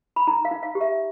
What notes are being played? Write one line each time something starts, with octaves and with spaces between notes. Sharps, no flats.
B5
D#4 A#5
F5
D#4
F5
G4
E5